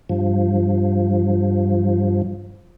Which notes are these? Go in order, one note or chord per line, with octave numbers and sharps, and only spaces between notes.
G2 F3